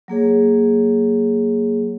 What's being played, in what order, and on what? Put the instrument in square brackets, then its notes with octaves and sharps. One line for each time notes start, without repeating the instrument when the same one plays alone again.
[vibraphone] F#3 A#3 G#4 C#5